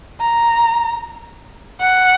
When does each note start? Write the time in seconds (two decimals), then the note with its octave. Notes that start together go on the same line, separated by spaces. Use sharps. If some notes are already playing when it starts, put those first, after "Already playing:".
0.20 A#5
1.81 F#5